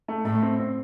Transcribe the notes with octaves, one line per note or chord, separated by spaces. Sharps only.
A3
A2 A3
C4
C4